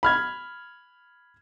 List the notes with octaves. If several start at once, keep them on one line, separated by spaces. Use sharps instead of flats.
B5 F6 G#6